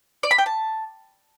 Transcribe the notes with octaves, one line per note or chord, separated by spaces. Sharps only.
D5
B5
G5
A5